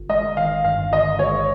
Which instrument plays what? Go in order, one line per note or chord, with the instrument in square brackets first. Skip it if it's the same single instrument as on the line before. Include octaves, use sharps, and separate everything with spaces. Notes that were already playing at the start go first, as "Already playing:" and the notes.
Already playing: [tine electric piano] G1
[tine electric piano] G#3 [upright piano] D#5
[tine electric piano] D#3 [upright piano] F5
[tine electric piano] G2 [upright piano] F5
[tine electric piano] G1 [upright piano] D#5
[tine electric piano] G#3 [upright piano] C#5